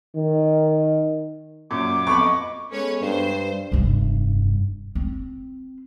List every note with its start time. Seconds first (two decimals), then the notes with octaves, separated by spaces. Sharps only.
0.16 D#3
1.71 F#2 A#2 D6
2.07 F2 B3 B5 C#6
2.21 D#5
2.72 G#3 B3 C#4 A4 B4 C#5
3.01 G2 C5
3.72 F1 G2
4.95 C4